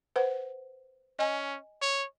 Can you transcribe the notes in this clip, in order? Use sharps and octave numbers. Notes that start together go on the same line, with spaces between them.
B4 C5 F#5
C#4 D#5 G#5
C#5